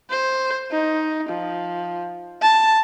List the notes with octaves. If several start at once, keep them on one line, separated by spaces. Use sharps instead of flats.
C5
D#4
F3
A5